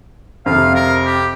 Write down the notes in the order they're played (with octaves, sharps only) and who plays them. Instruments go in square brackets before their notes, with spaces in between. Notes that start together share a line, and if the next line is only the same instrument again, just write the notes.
[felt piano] F2 C3 [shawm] F5
[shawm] A#4
G4